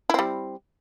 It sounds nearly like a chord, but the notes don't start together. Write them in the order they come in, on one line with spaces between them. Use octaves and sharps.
E4 C4 G3